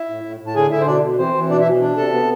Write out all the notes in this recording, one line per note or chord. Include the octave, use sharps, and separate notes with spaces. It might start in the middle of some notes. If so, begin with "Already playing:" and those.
Already playing: E4 E5
A2
A2
A2
A5
D3 G#4 G#5
D3 E4 E5
C5
B2 D4 D5
B2
E3 C4 C5
E3
B2 D4 D5
E4 E5
B2
D4
C3 A4 A5
B3